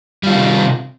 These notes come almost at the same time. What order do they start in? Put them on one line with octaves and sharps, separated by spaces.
G3 F4 D#3 C3